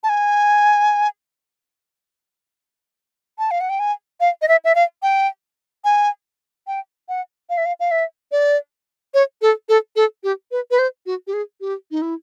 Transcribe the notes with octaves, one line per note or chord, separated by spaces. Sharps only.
A5
G#5
A5
F5
F#5
G5
G#5
F5
D#5
E5
E5
F5
G5
G#5
G5
F#5
F5
E5
F5
F5
E5
D5
C#5
A4
A4
A4
G4
B4
B4
C5
F#4
G4
G#4
G4
D#4
E4